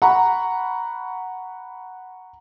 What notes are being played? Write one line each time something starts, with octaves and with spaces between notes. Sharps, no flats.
F#5 A#5 B5 C#6